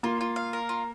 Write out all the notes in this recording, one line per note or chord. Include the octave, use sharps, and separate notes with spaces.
A#3 F4
F4
F5
A#4
F4